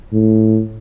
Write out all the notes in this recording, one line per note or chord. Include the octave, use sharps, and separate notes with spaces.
A2